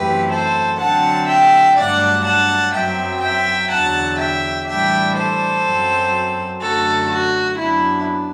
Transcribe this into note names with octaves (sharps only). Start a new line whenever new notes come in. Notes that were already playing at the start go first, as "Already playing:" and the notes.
Already playing: F#2 E3 A3 C4 G4 B4
A4 C5
D3 F#3 C4 F#5 A5
E5 G5
G2 F#3 A3 D4 D5 F#5
F#5 A5
F#2 F#3 C4 E5 G5
E5 G5
E2 D3 F#3 F#5 A5
E5 G5
A2 E3 G3 D4 E5 G5
A4 C5
F#2 F#3 C4
F#2 D3 A3 F#4 A4
F#4
F#2 F#3 B3 D4 E4